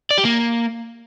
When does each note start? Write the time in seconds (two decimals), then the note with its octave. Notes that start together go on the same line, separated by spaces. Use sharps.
0.11 D5
0.18 G4
0.25 A#3